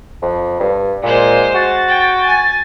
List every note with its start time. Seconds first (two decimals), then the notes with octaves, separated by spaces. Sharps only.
0.22 F2
0.60 G2
1.03 A#2 G#3 C5
1.55 F#4 A6
1.89 G5
2.26 G#5